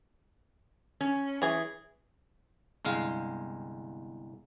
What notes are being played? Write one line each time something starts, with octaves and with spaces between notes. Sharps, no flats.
C#4
E3 G#4
G1 C2 G#3 F5